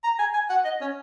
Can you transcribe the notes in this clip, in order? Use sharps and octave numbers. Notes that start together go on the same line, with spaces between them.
A#5
G#5
G#5
F#5
D#5
C#4